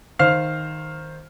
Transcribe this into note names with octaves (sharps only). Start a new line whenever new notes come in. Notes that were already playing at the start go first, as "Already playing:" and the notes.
D#3 C5 F5 F6 C7